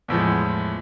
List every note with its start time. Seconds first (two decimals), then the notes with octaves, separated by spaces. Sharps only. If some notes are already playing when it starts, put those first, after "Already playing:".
0.08 E2 A2 F3 G#3